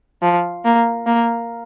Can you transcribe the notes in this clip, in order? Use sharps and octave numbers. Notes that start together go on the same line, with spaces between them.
F3
A#3
A#3